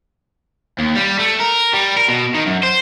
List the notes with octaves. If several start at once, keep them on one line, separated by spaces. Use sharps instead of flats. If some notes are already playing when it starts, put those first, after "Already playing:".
D#2
G3
A3
A#4
G3
A#4
B2
D#3
F#2
C5